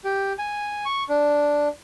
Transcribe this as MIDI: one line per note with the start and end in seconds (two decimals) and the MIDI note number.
0.04 0.33 67
0.39 0.85 80
0.85 1.03 85
1.09 1.68 62